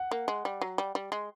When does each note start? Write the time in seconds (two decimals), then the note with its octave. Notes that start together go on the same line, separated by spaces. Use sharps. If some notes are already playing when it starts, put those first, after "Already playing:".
Already playing: F#5
0.11 A#3
0.28 G#3
0.45 G3
0.61 F#3
0.78 G3
0.95 G3
1.12 G#3